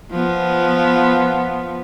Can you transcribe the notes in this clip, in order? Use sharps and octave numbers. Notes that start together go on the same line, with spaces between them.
F3 B3